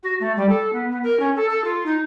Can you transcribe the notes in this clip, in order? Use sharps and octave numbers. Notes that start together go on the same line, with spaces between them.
F#4
A3
G3
A4
B3
B3
A#4
C#4
A4
A4
F4
D#4